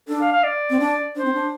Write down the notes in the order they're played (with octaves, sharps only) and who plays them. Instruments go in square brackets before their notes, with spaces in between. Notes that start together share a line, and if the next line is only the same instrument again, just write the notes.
[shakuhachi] D4 [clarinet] A4
[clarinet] F5
F5
D5
[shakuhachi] C4
D4
[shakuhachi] D4 [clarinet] C5
[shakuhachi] C4
D4